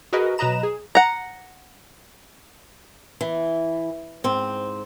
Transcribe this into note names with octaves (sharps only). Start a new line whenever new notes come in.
F#4 G#4 A#4 B4 D#5
B2 F#3 B4 D#5 A#5 E7
G#4
F#5 A#5
E3
G#2 C4